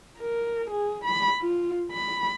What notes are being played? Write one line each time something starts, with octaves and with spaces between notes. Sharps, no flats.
A#4
G#4
B5
F4
B5